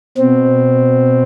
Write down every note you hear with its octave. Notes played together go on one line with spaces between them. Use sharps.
B2 C4